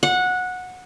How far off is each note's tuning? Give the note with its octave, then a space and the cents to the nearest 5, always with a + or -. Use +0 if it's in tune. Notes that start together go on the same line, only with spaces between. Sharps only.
F#5 -15